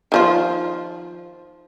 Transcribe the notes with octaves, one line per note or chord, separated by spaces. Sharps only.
D#3 F3 F4